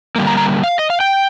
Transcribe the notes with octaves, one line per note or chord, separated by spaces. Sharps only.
D3 G3 A#3
A#5
A#5
F5
D#5
F5
G5